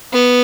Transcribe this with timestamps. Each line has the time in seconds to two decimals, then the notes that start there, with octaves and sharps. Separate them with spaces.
0.13 B3